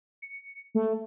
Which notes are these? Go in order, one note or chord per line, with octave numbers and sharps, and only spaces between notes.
C#7
A3